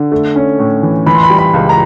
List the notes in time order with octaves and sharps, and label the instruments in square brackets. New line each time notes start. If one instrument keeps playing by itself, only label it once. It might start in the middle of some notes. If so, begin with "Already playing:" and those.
Already playing: [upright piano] D3
A3
C#4
A2
E3
E3 B5
C6
B5
G3
B5
C#2
A#5